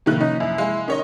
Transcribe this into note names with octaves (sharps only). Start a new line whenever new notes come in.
A2 C3 D#3 F3 A#3 F#6
C#4 D#4
F#2 E4
G#3 F5 G#5
D#3 C#4 C#5 D#5